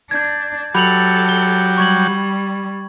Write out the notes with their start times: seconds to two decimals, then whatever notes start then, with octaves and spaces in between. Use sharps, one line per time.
0.11 D4 G6 G#6
0.75 F#3 G4 A4 B5 F7 F#7
1.29 G7
1.78 G3 C#6 G#6 F#7